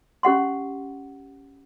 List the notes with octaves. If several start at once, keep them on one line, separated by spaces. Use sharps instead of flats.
C#4 G4 F#5 C6